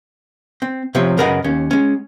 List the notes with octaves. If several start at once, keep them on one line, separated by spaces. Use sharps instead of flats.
C4
C3 F3 C4 C#5
F#2 C#3 A#4 B4 D#5 F#5
D#2 C#4
G#3 C#4